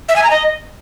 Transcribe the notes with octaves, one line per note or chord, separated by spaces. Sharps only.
E5
G#5
A#5
D#5